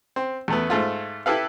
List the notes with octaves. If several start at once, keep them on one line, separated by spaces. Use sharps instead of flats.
C4
E2 A3 B3
G#2 A3 F4
E4 G4 A4 B4 F5